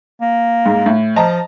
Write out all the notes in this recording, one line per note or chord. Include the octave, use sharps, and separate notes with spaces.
A#3
G#2
A2
F3 D#5 A5 A#5